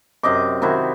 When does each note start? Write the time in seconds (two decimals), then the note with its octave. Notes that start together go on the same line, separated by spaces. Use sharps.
0.23 F#2 C3 D#5 D6
0.62 C3 D#3 E4 F#4